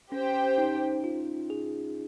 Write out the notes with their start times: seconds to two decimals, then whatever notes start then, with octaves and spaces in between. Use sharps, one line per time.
0.11 C#4 G4 C5 G5
0.58 D#4
1.04 F4
1.50 G#4